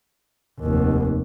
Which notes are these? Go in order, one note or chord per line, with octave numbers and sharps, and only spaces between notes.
F1 D#2